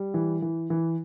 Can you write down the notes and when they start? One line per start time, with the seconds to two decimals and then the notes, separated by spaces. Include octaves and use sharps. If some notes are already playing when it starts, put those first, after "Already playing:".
Already playing: G3
0.14 E3
0.42 E3
0.70 E3